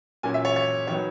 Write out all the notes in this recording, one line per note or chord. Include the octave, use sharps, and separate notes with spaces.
A#2 F#3 A#3 C#4 G#5
E5
C#5
C#5
D#3 F#3 B3 C#5